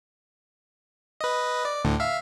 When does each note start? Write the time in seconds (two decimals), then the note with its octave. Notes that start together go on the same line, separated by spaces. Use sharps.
1.21 B4 D#5
1.65 D5
1.85 D2 A2 D3
2.00 E5 F5